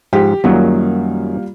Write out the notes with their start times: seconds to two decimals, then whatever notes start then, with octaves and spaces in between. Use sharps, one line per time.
0.13 G#2 F3 G4
0.44 F#2 D#3 F#3 G3 A#3 F4